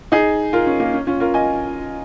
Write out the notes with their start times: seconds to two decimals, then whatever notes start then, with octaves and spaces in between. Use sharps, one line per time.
0.12 D#4 G#4
0.53 F4 A#4
0.67 C#4
0.80 A#3
0.94 C#4
1.07 C#4 F4
1.20 F4 A#4
1.34 D#5 G#5